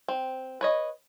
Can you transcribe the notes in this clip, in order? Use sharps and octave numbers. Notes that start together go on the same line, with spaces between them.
C4
B4 C#5 D#5